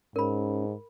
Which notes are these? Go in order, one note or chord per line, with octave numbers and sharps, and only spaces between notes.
G#2 C#4 A#4 B5